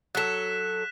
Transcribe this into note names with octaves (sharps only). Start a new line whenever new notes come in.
F#3 A4 F#6 B6 E7